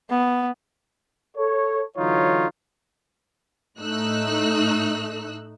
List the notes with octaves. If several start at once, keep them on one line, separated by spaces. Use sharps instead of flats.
B3
A4 C#5
D3 E3 F#3 D#4 F4 C#5
A2 A3 D#4 E6 F#6